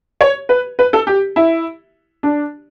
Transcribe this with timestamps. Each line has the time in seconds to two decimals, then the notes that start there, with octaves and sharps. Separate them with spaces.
0.21 C#5
0.49 B4
0.79 B4
0.93 A4
1.07 G4
1.36 E4
2.23 D4